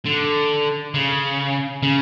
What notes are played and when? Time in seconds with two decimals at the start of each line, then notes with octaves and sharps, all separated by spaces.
0.05 D3
0.94 C#3
1.83 C#3